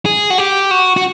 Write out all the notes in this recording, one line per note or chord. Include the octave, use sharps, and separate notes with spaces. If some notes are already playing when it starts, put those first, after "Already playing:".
G#4
F#4
G4
F#4
F#4